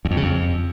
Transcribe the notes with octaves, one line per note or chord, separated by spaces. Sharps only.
E2
F2
C#3
F2